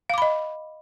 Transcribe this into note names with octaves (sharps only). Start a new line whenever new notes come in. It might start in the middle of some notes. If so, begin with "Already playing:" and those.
D#5 F5 B5 D6